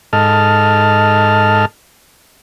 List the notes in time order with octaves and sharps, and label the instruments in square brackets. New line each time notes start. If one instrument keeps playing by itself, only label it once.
[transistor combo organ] G#2 A4 D#5 A5 F6